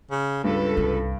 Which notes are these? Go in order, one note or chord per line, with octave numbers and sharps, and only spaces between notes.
C#3
C#2 G2 A4 B4
C2